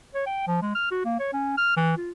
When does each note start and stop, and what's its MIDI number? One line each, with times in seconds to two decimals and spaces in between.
0.15 0.23 73
0.26 0.45 79
0.47 0.58 53
0.62 0.74 56
0.75 0.90 89
0.91 1.05 66
1.05 1.17 58
1.20 1.30 73
1.33 1.57 61
1.58 1.72 89
1.77 1.96 52
1.98 2.11 65